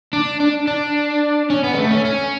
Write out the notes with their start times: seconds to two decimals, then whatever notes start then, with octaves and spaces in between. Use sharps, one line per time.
0.13 D4
0.40 D4
0.68 D4
1.50 C#4
1.64 B3
1.74 G#3
1.78 A3
1.91 C#4
2.05 C#4